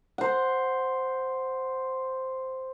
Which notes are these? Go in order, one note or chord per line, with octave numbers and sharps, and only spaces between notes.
C5 F#5